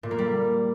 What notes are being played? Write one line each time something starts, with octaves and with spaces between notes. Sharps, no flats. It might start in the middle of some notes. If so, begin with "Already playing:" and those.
A#2
A#3
G3